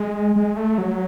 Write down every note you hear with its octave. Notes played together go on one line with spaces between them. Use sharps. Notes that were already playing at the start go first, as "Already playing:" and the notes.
Already playing: G#3
G#3
A3
F#3